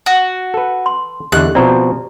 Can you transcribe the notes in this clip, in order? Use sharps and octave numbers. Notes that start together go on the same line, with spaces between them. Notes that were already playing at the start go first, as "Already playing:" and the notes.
F#4
A4 B4
C6
E2 D3 G4 D#5 F#6
B2 F3 C4 D5 A#5